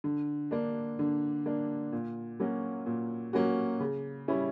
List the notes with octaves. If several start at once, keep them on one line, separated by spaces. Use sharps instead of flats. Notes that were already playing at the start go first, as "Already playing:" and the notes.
D3
A#3 D4
D3
A#3 D4
A#2
F#3 A#3 C#4 F#4
A#2
F#3 A#3 C#4 F#4
C#3
G3 C#4 E4